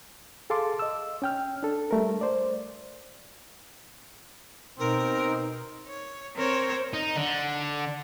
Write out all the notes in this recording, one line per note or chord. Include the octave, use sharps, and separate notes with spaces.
G#4 A4 F5 A5 C6 D6
D#5 E6
C#4 G5 F6
D4 A4
G3 A3 A#4
C5 D5
B2 C4 D#4 A#4
C#5
C4 A#4 C5 C#5
D#4
D3